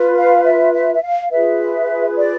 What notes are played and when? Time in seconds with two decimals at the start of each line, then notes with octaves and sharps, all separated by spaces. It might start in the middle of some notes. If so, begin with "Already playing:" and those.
Already playing: F4 B4
0.17 F5
0.45 E5
0.74 E5
0.94 E5
1.02 F5
1.30 F4 G#4 B4 E5
2.16 D5